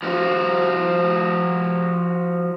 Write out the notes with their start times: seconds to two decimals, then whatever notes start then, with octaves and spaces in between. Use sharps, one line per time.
0.03 F3 A#3 C4 F4 F#4